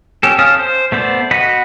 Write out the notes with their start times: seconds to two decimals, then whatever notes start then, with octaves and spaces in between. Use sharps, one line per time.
0.23 C#4 G4 A4
0.39 C#4 F5 A5 D#6 F6
0.59 C5
0.92 A3 B3 C5 D5
1.31 F#4 D#5 F#5 B5